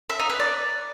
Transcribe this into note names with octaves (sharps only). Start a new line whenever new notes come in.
E5
D#4
B4
D5